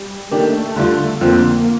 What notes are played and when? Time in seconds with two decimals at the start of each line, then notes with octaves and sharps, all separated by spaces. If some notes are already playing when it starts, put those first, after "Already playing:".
Already playing: G3
0.31 D#3 A3 A#3 D4 G4
0.76 D3 G3 D4 F4
1.21 F2 D3 F3 A#3 C4